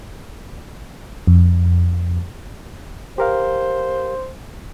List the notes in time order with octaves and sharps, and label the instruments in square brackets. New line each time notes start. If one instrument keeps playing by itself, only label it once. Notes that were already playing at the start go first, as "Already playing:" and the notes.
[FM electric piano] F2
[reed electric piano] G4 A#4 F5 [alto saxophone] C5